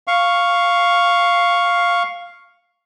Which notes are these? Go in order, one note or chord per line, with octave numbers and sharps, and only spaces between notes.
F5 C#6